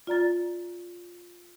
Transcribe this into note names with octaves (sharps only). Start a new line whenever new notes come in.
F4 D5 A#5 A6